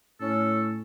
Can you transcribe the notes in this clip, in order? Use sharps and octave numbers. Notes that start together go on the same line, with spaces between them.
A2 C#4 A4